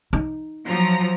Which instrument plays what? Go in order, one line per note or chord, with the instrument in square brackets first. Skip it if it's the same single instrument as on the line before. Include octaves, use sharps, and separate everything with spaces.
[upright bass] D#4
[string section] F3 F#3 A#5